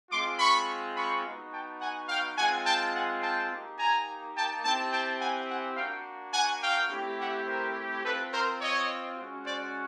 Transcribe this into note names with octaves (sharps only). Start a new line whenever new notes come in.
G#3 C4 F4 C6 D6
B5 C#6
B5 C#6
B3 D#4 F#4
G5 A5
F#5 G#5
F5 G5
G#3 C4 F4 F#5 G#5
G5 A5
F#5 G#5
G5 A5
A#3 D#4 G4
G#5 A#5
G5 A5
C4 E4 G4 G5 A5
G5 A5
F#5 G#5
F#5 G#5
A#3 D4 F#4 F5 G5
F#5 G#5
F5 G5
A3 C4 E4 G4
E5 F#5
A#4 C5
C4 F4 A4 B4
A#4 C5
C#5 D#5
G#3 C#4 F#4
C5 D5